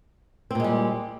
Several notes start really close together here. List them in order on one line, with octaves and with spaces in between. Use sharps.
C4 A#2 G#3 G3